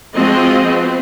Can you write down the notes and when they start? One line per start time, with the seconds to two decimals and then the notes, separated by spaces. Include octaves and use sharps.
0.14 F3 G#3 C4 F#4 D#5
0.63 B3 C4